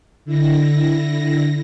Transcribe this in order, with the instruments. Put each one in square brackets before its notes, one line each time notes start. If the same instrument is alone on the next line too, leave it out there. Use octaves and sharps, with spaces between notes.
[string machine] D3 E4 A#6